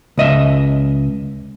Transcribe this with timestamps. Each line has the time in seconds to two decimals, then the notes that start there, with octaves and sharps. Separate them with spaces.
0.18 C#2 D#5 E5